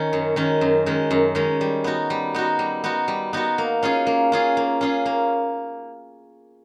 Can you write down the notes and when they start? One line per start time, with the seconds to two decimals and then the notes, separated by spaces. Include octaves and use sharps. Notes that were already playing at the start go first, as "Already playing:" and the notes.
Already playing: D#3 C#4
0.13 F#2
0.36 D#3 G#3 C#4
0.61 F#2
0.86 D#3 G#3 C#4
1.11 F#2
1.35 D#3 G#3 C#4
1.61 G3
1.84 B3 D#4 F#4
2.10 G3
2.34 B3 D#4 F#4
2.59 G3
2.84 B3 D#4 F#4
3.08 G3
3.33 B3 D#4 F#4
3.58 A#3
3.83 C#4 F4 G#4
4.07 A#3
4.32 C#4 F4 G#4
4.57 A#3
4.81 C#4 F4 G#4
5.05 A#3